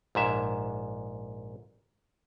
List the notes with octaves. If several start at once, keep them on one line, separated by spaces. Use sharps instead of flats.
A#1 G#2 E5